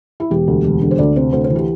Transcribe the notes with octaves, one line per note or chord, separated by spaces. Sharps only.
E4
E1 G4
D2
E1
D3
C5
D2 D5
C3 C5
D2 C5
C5
E3
G4